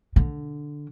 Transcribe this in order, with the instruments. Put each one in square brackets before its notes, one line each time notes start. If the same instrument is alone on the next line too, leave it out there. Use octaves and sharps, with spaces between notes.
[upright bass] D3